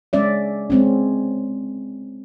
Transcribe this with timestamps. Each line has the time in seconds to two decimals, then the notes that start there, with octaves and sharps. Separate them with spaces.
0.13 G#3 C#4 D5 E5
0.70 G#3 C4 C#4